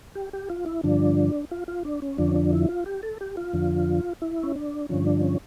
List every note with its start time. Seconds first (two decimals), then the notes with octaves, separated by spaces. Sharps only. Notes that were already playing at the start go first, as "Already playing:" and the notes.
0.15 G4
0.33 G4
0.50 F4
0.66 E4
0.83 G2 D3 F3 D4
1.51 F4
1.68 F4
1.85 D4
2.02 C#4
2.18 F2 D3 F3 D4
2.28 C#4
2.36 D4
2.53 E4
2.69 F4
2.86 G4
3.03 A4
3.21 G4
3.37 F4
3.53 F2 D3 F3
4.22 E4
4.43 C#4
4.56 D4
4.89 G2 D3 F3 C#4
5.06 D4
5.23 C#4